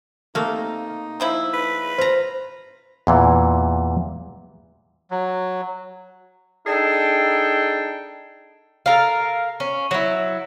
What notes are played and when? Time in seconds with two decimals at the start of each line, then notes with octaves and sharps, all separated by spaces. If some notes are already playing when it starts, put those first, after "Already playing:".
0.35 C3 A3 A#3 D#4 F5
1.20 D#3 F3 E4
1.53 B4
1.98 F4 C5 A#5
3.07 E2 A#2 E3
5.11 F#3
6.66 D4 D#4 G#4 A4 G5
8.86 A4 A#4 F5
9.60 C#4
9.91 F#3 E4